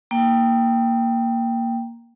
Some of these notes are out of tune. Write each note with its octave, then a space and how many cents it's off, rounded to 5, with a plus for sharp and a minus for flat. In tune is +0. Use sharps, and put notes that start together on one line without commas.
A#3 +0 G5 +0